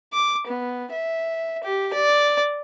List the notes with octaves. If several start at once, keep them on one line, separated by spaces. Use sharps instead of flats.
D6
B3
E5
G4
D5